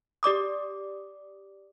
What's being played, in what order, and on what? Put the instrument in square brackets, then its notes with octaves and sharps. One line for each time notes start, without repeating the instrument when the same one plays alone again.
[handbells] G4 D5 D6 D#6